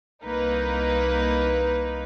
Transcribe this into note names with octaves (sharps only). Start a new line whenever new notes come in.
C2 A#3 D#4 B4